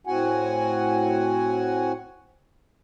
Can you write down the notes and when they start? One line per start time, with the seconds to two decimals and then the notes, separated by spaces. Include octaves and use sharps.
0.07 A2 C4 F#4 F#5 G#5